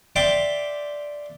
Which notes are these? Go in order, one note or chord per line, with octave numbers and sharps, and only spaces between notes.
D5 E5 F5 G5 C6 D6